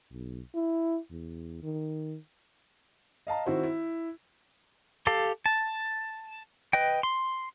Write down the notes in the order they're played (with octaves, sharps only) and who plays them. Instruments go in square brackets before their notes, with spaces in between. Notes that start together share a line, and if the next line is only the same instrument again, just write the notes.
[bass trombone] B1
E4
E2
D#3
[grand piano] D#5 F5 A5 A#5
D#3 C4 E4 F#4 C5
E4
[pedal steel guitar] G4 A4 F5
A5
B4 D#5 G5
C6